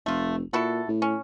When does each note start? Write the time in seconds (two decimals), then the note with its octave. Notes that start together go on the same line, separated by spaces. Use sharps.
0.06 F1 A3 F4
0.53 A#2 E4 F#4 A4
0.89 A2
1.02 C#4